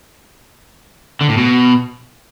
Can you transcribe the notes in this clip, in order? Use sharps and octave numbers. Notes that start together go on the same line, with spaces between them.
D3
A2
B2